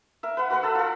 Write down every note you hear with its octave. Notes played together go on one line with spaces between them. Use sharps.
A#4 E5
B4 F#5
F#4 A#4 B4 F#5
A4 A5 E6
F4 A4